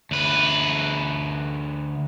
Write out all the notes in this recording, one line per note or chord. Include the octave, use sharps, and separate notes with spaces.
D2 B4